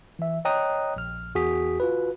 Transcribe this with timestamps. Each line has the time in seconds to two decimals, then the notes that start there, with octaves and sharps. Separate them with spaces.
0.19 E3 E5
0.45 C#5 D#5 G5 A#5 D#6 F#6
0.96 A#1 F6
1.35 E2 F#4 G#4 D#6 B6
1.80 F4 F#4 B4